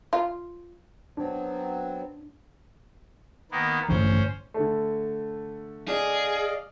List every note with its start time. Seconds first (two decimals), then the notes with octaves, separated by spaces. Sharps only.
0.13 F4
1.17 F#3 B3 C4 D4
3.51 D#3 A#3 B3
3.89 A1 G2 D3 C#4 C5
4.54 D3 A3
5.88 G#4 D5 D#5 F5